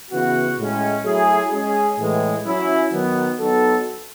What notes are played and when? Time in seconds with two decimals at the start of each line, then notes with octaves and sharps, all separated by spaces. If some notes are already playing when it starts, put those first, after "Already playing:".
0.11 C#3 E3 B3 F#4
0.59 A2 G#3 C#4
1.04 F#3 A3 E4 G#4
1.52 G#3 C#4 G#4
1.98 A2 E3 G#3
2.45 F#3 C#4 E4
2.93 D#3 F#3 B3
3.39 F#3 B3 D#4 F#4 A4